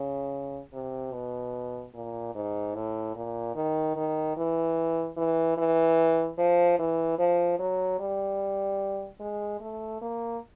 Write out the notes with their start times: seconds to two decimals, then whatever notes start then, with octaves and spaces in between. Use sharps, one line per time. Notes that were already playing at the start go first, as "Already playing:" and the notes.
Already playing: C#3
0.73 C3
1.13 B2
1.94 A#2
2.35 G#2
2.74 A2
3.15 A#2
3.55 D#3
3.96 D#3
4.36 E3
5.17 E3
5.57 E3
6.38 F3
6.79 E3
7.18 F3
7.59 F#3
7.99 G3
9.20 G#3
9.60 A3
10.01 A#3